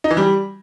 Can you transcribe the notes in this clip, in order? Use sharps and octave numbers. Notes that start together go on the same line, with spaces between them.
D#4
E3
G3